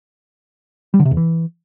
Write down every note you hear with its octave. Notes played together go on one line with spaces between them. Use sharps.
G3
D3
C3
E2
E3